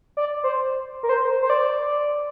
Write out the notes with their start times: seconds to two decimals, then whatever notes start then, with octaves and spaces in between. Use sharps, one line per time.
0.17 D5
0.44 C5
1.03 A#4
1.09 C5
1.42 C5
1.50 D5